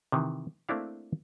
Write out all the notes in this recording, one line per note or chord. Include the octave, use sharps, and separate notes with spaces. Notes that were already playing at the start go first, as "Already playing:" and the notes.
C3 D#3 E3
A3 A#3 C4 D4 E4 F5